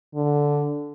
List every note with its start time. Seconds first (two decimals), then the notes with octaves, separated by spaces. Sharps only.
0.15 D3